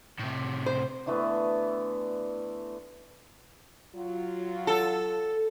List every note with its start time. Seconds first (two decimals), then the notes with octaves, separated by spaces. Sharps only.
0.20 A2 C3
0.66 C5
1.06 D3 E3 A3 B3
3.95 F#3 F4
4.67 A4